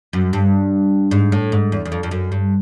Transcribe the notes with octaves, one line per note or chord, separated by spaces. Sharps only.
F#2
G2
G#2
A2
G#2
E2
E2
F2
F2
F#2
G2